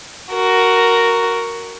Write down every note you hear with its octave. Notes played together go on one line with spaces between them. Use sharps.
F#4 A#4